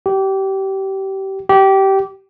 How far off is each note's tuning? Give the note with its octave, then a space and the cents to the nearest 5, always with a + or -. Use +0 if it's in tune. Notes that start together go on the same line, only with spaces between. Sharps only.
G4 -25
G4 -20